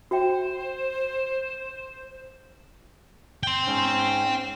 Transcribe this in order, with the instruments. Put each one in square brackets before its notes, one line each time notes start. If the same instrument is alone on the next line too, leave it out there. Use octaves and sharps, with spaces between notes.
[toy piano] F#4 E5 G5 [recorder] C5
[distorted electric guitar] G5 C6
[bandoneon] G#2 C#4